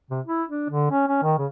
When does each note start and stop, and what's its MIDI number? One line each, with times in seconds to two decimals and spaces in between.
0.10 0.21 48
0.26 0.43 64
0.49 0.69 62
0.70 0.87 50
0.91 1.06 61
1.08 1.20 61
1.22 1.34 51
1.38 1.47 49